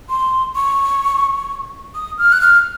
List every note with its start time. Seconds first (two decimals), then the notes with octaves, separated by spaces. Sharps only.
0.10 C6
0.56 C#6
1.95 D#6
2.18 F6
2.33 F#6
2.41 F6